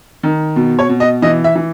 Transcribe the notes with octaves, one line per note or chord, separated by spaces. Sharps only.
D#3
B2
C#5
B2
D#5
E3 D#5
E5
E3